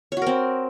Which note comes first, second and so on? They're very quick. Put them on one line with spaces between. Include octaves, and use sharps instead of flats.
C#5 F#4 A#4 C4